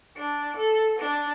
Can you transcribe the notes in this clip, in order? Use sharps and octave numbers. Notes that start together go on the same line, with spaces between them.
D4
A4
D4